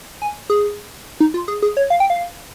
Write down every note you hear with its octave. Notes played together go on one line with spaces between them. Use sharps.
G#5
G#4
D#4
F4
G#4
G#4
C#5
F5
G5
F5